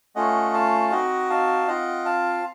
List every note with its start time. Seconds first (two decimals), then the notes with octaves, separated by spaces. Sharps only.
0.16 A3 C#4 F4 D#5 F#5
0.54 F5 A5
0.91 C4 D#4 F#4 D#5 F#5
1.30 F5 A5
1.67 C4 F4 D#5 F#5
2.05 F5 A5